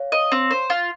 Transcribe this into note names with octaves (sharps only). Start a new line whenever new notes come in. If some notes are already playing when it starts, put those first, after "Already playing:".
Already playing: C#5 F5
D#5
C4
C5
F4